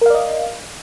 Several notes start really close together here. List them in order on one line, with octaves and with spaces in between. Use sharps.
A#4 F5 D5 D#5